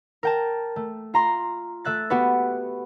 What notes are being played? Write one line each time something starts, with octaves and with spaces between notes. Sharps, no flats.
A#4 G5 A5
A3
F4 A#5 C6
A3 E5 F#6 A6
B3 F#4 G4 B4